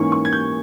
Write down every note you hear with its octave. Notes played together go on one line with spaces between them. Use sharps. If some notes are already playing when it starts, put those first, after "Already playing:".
Already playing: G#2 E3 A#3 C#4 C#6
C#6
G#6
G6